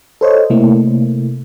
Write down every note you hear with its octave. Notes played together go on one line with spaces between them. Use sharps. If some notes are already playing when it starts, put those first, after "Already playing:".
A4 C5 C#5 D#5
C3 A3 A#3 E4